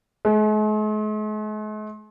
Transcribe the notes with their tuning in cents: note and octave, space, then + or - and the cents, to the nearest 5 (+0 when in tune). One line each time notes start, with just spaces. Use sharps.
G#3 +45